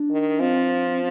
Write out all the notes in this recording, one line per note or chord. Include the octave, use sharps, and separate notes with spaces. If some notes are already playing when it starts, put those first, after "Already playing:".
Already playing: D4
D#3
F3 C4